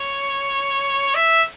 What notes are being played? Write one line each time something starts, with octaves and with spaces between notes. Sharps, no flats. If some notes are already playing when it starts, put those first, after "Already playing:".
Already playing: C#5
E5